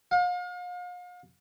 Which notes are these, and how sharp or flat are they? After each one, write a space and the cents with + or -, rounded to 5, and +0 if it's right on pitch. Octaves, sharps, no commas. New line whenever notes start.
F5 +40